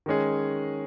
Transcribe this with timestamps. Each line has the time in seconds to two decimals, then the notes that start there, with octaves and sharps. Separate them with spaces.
0.06 D#3 G#3 C#4 G#4